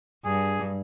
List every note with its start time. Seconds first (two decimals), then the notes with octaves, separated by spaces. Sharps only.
0.25 G2 G#4